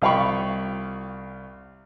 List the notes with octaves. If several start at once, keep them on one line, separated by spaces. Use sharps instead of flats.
C2 F4 F5 G5 B5 C#6